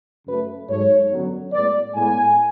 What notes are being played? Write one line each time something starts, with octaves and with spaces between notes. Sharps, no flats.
F#2 C#3 F#3 A3 B4
G#2 F#3 A3 C#5
F#2 D3 F#3 B3
A2 G#3 B3 D5
A2 G#3 B3 G#5